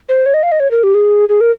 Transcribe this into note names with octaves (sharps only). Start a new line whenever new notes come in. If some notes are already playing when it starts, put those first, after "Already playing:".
C5
C#5
D#5
F5
D#5
C#5
A#4
G4
G#4
G#4
A#4